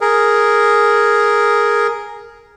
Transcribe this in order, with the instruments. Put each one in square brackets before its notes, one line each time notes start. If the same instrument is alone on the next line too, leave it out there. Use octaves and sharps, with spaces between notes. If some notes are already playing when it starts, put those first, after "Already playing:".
[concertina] G#4 A#4